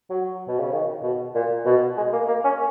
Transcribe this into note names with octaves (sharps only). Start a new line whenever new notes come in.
F#3
B2
C#3
D#3
B2
A#2
B2
G#3
A#3
A#3
C#4